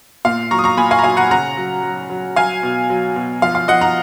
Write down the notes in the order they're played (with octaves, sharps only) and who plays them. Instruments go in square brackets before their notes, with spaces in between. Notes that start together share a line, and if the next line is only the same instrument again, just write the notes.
[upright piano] A#2 F5
F#3 A#5 C#6
D#6
A#5 C#6
A#2 G#5 B5
F5 G#5
A#5
F#3 F5 G#5
F#5 A#5
C#3 F#5 A#5
F#3
F#3
F#3
F#3 F5 G#5
B2
F#3
B2
F3 F5
F5
F3 D#5 F#5
F#5 A#5